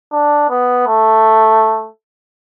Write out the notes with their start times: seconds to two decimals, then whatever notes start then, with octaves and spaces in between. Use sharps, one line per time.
0.12 D4
0.50 B3
0.87 A3